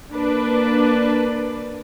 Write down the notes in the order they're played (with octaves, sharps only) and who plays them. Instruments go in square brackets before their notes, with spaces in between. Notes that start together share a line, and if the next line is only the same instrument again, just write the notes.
[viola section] A#3 D4 B4 D5